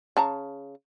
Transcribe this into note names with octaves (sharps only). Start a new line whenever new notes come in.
C#3 A5 A#5